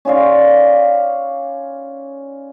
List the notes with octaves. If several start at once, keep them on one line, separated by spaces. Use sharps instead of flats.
C#4 F4 D5 F5